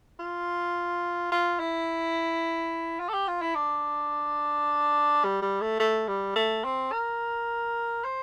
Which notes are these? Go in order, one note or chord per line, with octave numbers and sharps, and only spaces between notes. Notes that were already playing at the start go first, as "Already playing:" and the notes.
F4
F4
E4
F4
A4
G4
F4
E4
D4
G3
G3
A3
A3
G3
A3
C4
A#4
C5